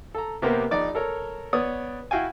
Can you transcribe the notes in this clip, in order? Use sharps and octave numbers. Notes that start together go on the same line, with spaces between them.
A4 A#5
C3 A#3 B3 G4 A#4 C5
A#1 D#4 D5 D6
A4 A#4 C#5
B3 C#5 D5 D#6
E4 F#4 F5 G5 G#5